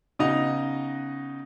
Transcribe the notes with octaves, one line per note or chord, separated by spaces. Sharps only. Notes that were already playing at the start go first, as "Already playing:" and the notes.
C#3 B3 D#4 F#4 D#5 F7